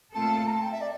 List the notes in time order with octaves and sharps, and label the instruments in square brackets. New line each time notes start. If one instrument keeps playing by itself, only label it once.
[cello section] A#2 A3 C4 F4 A4 [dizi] A5
[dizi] A#5
A5
G5
E5
D5